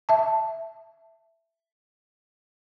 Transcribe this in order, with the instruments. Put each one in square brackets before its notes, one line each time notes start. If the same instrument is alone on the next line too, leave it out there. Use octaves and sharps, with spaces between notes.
[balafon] E5 A5